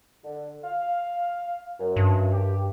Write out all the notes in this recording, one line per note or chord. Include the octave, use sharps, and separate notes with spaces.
D3
F5
F#2
G2
G4